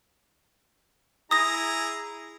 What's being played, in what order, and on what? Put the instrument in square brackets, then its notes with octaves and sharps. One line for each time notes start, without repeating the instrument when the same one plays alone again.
[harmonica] E4 G#4 A#5 [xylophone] D#6 A#6